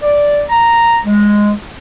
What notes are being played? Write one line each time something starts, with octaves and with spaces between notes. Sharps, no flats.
D5
A#5
G#3